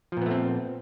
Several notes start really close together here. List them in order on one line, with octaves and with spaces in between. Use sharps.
F3 A#2 B3 A3 C4